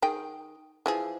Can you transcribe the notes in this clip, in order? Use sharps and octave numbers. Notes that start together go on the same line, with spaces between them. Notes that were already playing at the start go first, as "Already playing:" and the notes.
D#3 G#4 G5
E3 F3 G#4